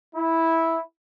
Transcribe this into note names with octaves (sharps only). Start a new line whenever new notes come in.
E4